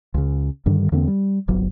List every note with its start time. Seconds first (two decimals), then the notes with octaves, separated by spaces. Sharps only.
0.14 C#2 C#3
0.66 G2 D3 D#3 G3
0.92 E2 D3 A#3 C4
1.07 G3
1.48 D1 G1 F#3